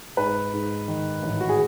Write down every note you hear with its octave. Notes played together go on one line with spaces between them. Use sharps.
G#2 B4
G#2
D#3
A1
F#4
G#4